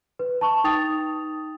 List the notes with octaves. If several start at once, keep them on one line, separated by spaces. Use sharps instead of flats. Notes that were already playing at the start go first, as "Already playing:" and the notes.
B4
A5 C#6
D#4 G5 D#6 A6 F7